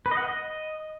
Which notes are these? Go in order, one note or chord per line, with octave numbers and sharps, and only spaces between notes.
B4
D#5
F#5
D#5